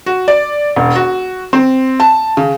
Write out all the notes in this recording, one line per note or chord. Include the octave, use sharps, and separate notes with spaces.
F#4
D5
E1
F#4
C4
A5
C#3